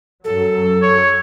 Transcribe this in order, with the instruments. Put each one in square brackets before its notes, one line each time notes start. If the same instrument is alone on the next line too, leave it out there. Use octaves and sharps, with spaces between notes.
[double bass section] F#2 F#3 [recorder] A4
[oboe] C#5